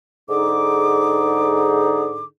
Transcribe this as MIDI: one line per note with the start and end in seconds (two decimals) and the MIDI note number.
0.29 2.25 44
0.29 2.25 50
0.29 2.25 63
0.29 2.25 68
0.29 2.25 86